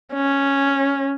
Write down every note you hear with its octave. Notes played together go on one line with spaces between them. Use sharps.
C#4